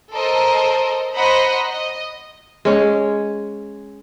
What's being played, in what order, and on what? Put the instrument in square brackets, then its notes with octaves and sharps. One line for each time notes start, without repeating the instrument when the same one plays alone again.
[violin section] A4 A#4 C5 D#5
C5 D#5 F#5 A#5 B5
D#5
[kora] G#3 C#4